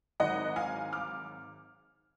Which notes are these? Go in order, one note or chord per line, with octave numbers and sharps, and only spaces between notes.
G#1 G#2 F#3 D#5 F#5
F5 G#5
D6 F6